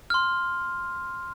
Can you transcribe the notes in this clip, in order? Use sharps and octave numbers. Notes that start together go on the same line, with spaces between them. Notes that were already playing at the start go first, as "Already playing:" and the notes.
C6 F6